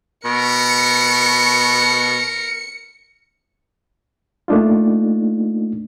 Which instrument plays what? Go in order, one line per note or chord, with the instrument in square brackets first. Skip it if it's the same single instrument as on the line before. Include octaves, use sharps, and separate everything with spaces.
[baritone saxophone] B2 [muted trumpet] A#4 [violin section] C#7
[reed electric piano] A3 A#3 D4 D#4 F4